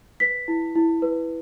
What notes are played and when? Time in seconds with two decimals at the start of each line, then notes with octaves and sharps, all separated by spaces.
0.20 B4 B6
0.48 E4
0.75 E4
1.02 B4